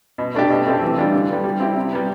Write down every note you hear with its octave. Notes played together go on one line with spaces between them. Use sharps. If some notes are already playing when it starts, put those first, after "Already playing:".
B2
A3 D4 G4
B2
A3 C4 G4
E3
G3 D4 F4
D3
G3 B3
G3
C4 E4 G4
C3
G3 B3